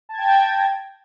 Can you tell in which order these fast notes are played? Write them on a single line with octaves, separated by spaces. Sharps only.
A5 G#6 G5 A#6